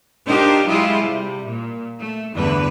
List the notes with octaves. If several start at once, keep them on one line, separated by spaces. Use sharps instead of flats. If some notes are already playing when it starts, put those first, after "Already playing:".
D4 D#4 F4 G4 A#4 C5
F#3 G#3 E4 F4 G4 G#4
C3 G3
A#2
A3
E2 G2 D3 B4